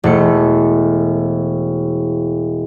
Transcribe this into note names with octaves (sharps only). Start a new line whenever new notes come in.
E1 A3 C#7